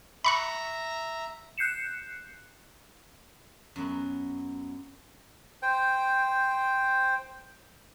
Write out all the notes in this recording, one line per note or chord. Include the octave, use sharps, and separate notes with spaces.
E5 A#5 B5 C#6 F#6
F#6 G6 C7 C#7 E7
F#2 B3
C5 G5